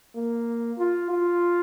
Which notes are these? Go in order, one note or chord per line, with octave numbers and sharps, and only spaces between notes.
A#3
F4
F4